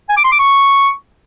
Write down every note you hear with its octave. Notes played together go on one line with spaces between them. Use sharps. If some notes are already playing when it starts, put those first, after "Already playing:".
G#5
D6
C6
D6
C#6